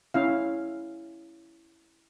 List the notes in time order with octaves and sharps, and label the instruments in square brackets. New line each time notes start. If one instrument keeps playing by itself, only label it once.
[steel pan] C#4 E4 F5